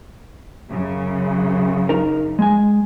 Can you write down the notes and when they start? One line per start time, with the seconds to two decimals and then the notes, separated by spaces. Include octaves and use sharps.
0.71 F#2 C#3
1.89 D#4 A#4
2.39 G#3 G#5